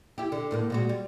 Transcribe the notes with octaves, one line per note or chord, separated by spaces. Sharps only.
E4 G4
D3
D2 A2 A#3
A#2 G#3 F#4
G3